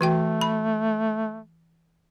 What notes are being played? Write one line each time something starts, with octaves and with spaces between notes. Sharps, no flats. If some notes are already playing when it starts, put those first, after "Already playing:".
E3 A3 F#4 G5
B5